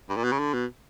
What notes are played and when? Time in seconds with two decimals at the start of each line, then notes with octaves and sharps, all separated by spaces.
0.09 G2
0.16 A#2
0.24 B2
0.32 C#3
0.39 D3
0.53 B2